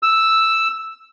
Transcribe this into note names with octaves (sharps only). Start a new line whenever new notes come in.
E6